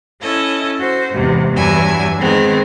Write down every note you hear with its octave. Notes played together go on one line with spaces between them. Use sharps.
C#4 E4 A4 D#5
F#4 C5
E2 G#2 C3
E2 G2 F#3 D4 E4 G#5
D#3 G#3 B3 C4